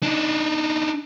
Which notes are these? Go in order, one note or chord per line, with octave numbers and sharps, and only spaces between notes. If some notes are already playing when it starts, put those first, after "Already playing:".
D4 D#4